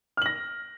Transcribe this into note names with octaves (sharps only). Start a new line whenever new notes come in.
F6 A#6 F#7